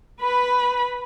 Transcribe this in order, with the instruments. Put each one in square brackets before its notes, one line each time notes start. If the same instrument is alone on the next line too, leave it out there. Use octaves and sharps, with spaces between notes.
[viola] B4 B5